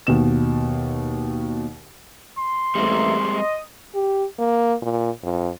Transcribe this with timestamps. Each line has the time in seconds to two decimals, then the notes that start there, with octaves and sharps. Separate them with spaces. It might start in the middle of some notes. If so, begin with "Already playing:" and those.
0.07 D#2 B2 E7
2.38 C6
2.75 A1 G3 G#3 A#3 C4 E5
3.35 D#5
3.95 G4
4.38 A#3
4.82 A#2
5.23 F2